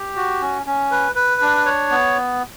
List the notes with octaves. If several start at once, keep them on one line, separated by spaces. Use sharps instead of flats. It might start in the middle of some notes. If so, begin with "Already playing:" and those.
Already playing: G4
F#4
C#4
C#4
B4
B4
D4
C#5
B3